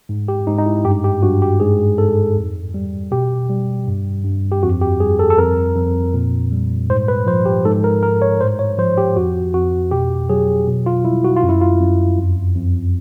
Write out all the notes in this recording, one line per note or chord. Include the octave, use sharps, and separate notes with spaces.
G#2
G4
G#2 D#4
D#4
E4
G2 G4
G4
G2 F#4
G4
G#2 G#4
G#2 A4
F2
G3
B2 G4
G3
G2
G2
G4
F2 F#4
G4
G3 G#4
A4
A4
F2 A#4
F2
A#2
G3
G#2 C5
B4
F3 C5
G4
G#2 A4
A#4
G#2 A#4
C#5
A2 C5
C#5
F3 C5
G4
F2 F#4
F2 F#4
B2 G4
F#3 G#4
B2
F4
G3 E4
F#4
F4
F#2
E4
F4
F#2
F2
F2